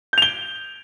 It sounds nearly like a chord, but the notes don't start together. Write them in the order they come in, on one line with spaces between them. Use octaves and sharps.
G6 F7 G7